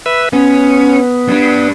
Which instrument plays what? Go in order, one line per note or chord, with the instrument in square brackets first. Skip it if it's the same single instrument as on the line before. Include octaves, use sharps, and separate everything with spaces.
[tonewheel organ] B4 E5
[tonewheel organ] B3 [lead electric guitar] C#4
[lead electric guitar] G3 D4